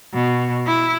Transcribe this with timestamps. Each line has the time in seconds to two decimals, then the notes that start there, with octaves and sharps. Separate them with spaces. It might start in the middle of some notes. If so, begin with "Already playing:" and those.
0.14 B2
0.67 E4